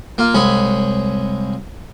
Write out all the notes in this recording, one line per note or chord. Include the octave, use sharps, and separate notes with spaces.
A#3 F4
C2 G#3 G#4 C#5 B5